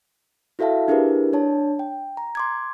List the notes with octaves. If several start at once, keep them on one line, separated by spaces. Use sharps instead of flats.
E4 F#4 A4 E5 F5 A5
D4 E4 G4 G#4 A#4 B4
D4 C#5 A5
G5
A#5
C6 D6 G#6